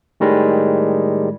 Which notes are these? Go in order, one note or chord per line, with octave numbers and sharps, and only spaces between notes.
A2 D#3 G3 G#3